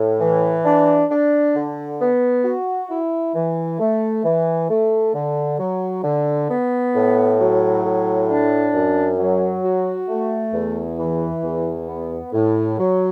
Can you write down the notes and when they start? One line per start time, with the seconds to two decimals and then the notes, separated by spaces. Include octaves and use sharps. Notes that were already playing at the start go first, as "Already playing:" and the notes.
Already playing: A2
0.20 E3
0.65 D4
1.09 D4
1.55 D3
2.00 B3
2.44 F#4
2.90 E4
3.35 E3
3.79 A3
4.25 E3
4.69 A3
5.14 D3
5.59 F#3
6.04 D3
6.49 B3
6.94 A2
7.39 F#3
7.84 A2
8.29 D4
8.74 F#2
9.18 F#3
9.64 F#4
10.08 A3
10.53 E2
10.98 E3
11.43 E2
11.88 B3
12.33 A2
12.78 F#3